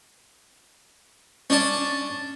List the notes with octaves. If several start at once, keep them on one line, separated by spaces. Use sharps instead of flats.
C#4 D4 A5